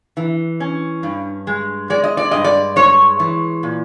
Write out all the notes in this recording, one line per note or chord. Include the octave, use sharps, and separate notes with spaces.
E3
C#4
G2
G#3
G#3 D5
D#5
D5
G2 D#5
D5
G#3 C#5
E3
A#2